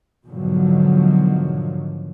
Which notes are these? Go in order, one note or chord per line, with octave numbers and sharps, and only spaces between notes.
G#2 B2 D3 D#3 F3 F#3